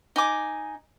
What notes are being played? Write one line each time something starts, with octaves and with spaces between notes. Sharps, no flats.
D#4 G#5 D6